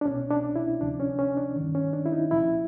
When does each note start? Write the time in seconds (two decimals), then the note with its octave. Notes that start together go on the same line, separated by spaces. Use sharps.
0.01 D4
0.05 C2 B2 C#4
0.31 D4
0.56 E4
0.80 D2 C3 F3 D4
1.00 C#4
1.19 C#4
1.37 D4
1.56 G2 D#3
1.75 C#4
1.93 D4
2.06 E4
2.12 D#4
2.31 C2 A#2 F3 E4